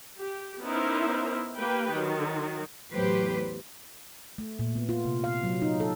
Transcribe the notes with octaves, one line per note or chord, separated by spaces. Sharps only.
G4
B3 C#4 D#4 E4 A#4 C5
A#3 G4 B4 G5
D#3 F#3
E2 A2 F#3 G4 B4 C5
A3
A#2
B3
F4
C3
F5
F#3
D#4
A4